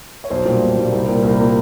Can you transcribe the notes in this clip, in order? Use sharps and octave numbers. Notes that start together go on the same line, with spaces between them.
C#5
B1 C5
A#2 G3
B1
A#2 G3
C2
A#2 G3 A#3
C2 A#4
A#2 G3 A#3